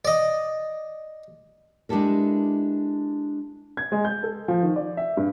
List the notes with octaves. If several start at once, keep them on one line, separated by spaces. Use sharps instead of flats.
D5 D#5
G#3 D4 E4 G4 A4 A#4
G#6
G#3
G6
A4
F3
D#3
D5
E5
G2